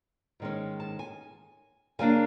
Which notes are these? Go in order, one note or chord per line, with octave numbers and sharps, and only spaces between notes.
G#2 D#3 G#3 C#4
A5
G#5
C#3 F3 A#3 D4 G#5